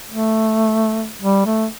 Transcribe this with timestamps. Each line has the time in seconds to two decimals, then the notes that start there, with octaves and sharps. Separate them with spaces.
0.10 A3
1.22 G3
1.46 A3